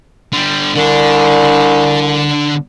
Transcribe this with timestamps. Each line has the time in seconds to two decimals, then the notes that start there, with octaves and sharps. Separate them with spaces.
0.33 D3 G3
0.75 C2 D3 D4